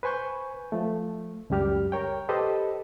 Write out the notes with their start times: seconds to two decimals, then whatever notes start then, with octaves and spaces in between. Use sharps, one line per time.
0.03 B4 C5 G#5 C#6 G6
0.72 F3 A3
1.50 C#2 F#2 G3 G4 F6
1.92 A#4 C#5 G5
2.29 G4 A4 B4 C5 D#5